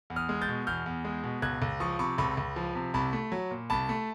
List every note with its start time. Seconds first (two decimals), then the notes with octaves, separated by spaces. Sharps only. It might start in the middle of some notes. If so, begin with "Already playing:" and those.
0.10 E2
0.16 D#6 F6
0.29 G#3
0.42 G6 A6
0.48 B2
0.67 E2 F6 G6
0.86 E2
1.05 G#3
1.24 B2
1.42 C#2 F#6 G#6
1.62 C#2
1.80 F3 C#6 D#6
1.99 C3 B5 C#6
2.18 C#2 B5 C#6
2.37 C#2
2.56 F3
2.75 C3
2.94 C2 A5 B5
3.13 A3
3.32 F#3
3.51 A#2
3.70 C2 A5 B5
3.89 A3